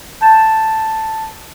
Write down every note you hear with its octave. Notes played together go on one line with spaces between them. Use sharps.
A5 G6 A6 E7